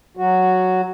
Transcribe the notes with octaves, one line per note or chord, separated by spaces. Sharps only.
F#3 F#4